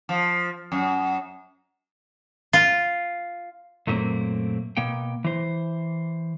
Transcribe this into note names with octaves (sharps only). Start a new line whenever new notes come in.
F3
F#2
F4
F#2 A#2 F#3 A3 A#3 C4
B2 A#3 G5
E3 C5